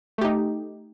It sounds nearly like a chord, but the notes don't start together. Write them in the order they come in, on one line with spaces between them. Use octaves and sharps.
A3 G4 D#4